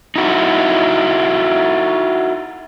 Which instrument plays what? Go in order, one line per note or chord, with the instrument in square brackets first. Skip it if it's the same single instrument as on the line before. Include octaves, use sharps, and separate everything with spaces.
[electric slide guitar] D#4 E4 F#4